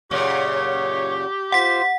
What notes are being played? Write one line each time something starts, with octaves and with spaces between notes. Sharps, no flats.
F#2 A#2 C#3 G4 C#5
F4 C5 F#5 B6